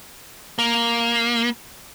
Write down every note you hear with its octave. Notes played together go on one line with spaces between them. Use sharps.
A#3